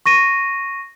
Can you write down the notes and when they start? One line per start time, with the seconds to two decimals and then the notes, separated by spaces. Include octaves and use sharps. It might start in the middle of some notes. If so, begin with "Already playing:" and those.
0.06 C#6 A#6 D#7